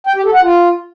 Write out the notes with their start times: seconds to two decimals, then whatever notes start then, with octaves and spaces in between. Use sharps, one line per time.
0.07 G5
0.16 G4
0.25 A4
0.33 F#5
0.42 F4